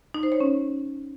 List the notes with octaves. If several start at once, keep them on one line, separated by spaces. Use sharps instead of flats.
D#4
C5
C#5
C#4